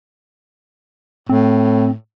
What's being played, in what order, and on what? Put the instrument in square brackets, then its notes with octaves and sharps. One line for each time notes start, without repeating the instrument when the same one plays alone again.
[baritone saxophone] A2 [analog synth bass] C4